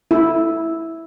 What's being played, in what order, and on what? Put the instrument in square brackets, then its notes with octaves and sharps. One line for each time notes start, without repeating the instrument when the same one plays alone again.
[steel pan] E4